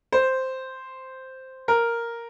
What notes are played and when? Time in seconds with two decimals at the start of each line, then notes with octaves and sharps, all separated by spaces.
0.12 C5
1.68 A#4